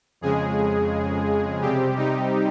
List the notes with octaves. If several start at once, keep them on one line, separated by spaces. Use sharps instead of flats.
F2 C#3 G#3 G#4
C3 G3 C4 G4
D#4